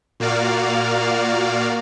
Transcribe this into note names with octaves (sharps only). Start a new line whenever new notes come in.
A#2 A#3 F#4 D5 F5 F6